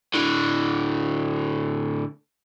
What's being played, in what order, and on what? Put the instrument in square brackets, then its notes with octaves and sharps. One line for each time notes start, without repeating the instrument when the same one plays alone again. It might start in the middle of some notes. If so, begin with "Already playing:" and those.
[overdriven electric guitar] A2 D3